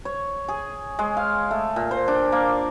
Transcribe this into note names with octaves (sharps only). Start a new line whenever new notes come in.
C#5
G#4
G#3
F5
A3
A#2
C5
D4
A#3